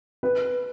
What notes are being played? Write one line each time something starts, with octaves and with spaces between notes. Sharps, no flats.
B4